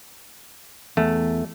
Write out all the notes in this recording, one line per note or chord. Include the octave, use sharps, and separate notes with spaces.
E2 A3